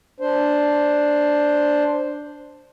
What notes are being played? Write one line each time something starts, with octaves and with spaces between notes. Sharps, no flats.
D4 C5